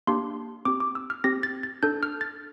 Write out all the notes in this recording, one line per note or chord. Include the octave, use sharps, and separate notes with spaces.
A#3 D4 G4 C6
C4 G4 D6
D6
E6
F6
C4 G4 A#6
A6
A6
D4 A4 G6
F6
A6